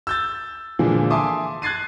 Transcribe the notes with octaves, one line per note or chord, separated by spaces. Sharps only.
E6 G6 A6
A#2 D3 E3 F3 G#3
E5 G#5 A5 C6 D6 D#6
F#6 G#6 A6 C7 D#7